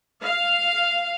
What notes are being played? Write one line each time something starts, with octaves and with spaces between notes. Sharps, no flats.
F5